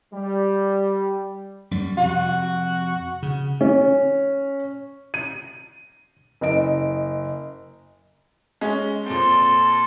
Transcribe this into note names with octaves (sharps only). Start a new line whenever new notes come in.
G3
F#2 G3
F2 C3 F#4
C#3
C#4
D#7
F#1 D#5 D7
G#3 C#4
A#2 C4 A4 C6